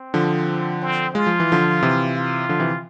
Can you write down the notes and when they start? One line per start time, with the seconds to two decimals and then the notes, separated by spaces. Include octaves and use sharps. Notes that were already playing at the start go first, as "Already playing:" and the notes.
Already playing: C4
0.14 D3 F3
0.81 C4
1.15 G#3 F4
1.27 F3
1.40 E3
1.52 D3 F3
1.82 C3 E3
2.15 F4
2.49 D3 F3
2.60 C3 E3